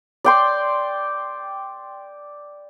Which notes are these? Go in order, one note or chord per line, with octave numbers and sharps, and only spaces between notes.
D5 G5 C6